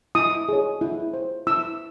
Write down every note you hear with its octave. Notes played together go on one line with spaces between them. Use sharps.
E4 D#6
G#4 C#5
E4
C5
E4 E6